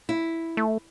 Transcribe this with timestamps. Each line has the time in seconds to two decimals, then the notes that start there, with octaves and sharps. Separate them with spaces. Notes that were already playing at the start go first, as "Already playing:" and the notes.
0.09 E4
0.57 A3